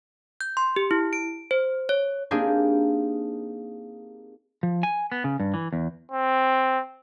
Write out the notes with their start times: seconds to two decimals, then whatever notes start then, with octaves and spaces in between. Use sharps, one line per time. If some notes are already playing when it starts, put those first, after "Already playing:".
0.41 G6
0.57 C6
0.76 G4
0.91 E4
1.13 D7
1.51 C5
1.89 C#5
2.31 A#3 C4 D4 D#4 G4 G#4
4.63 F3
4.83 G#5
5.12 B3
5.24 C#3
5.40 G2
5.54 E3
5.73 E2
6.11 C4